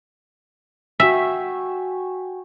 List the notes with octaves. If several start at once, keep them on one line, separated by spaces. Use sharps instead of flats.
F#4 E5 G5 G#5